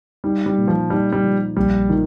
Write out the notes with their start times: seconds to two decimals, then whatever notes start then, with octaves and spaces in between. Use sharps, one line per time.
0.24 G3 D#4
0.46 G3
0.57 A#2
0.68 F3
0.90 G3 D#4
1.12 G3
1.23 F3
1.57 A#1 G3
1.89 D#3 F3